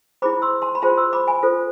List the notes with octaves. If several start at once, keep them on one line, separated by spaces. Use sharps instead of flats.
E4 G#4 C5 B5 D6
C6 E6
A5 C6
B5
F4 G#4 C5 A5 C6
C6 E6
B5 D6
G#5 B5
F4 A4 C5